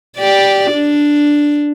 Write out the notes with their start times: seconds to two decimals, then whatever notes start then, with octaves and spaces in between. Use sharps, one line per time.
0.17 G4 D5
0.71 D4